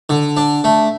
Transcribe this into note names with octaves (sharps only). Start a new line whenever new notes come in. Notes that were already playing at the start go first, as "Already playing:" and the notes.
D3
D4
A3